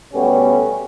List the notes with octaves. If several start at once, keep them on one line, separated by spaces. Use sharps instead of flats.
B2 G3 A3 B3 C#4 G4